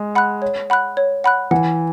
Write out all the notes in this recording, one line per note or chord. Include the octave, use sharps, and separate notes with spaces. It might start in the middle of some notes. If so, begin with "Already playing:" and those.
Already playing: G#3
F#5 B5 F#6
C#5
F#5 B5 F#6
C#5
F#5 B5 F#6
E3 F#5